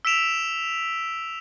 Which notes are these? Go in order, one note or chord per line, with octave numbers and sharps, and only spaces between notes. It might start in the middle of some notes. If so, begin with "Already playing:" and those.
E6 B6 D7 E7 F7